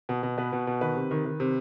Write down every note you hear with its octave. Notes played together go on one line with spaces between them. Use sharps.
B2
B2
B2 B4
B2
B2
D#3 B4
C3
D#3
D#3
C3